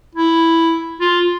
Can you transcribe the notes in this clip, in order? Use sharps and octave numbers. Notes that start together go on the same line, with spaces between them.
E4
F4